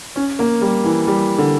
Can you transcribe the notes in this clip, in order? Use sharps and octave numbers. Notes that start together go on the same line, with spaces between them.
C#4
A#3
G3
E3
G3
D3